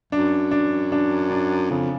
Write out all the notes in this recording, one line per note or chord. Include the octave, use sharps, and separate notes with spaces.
F#2 D4
D4
D4
D4
F2 C#3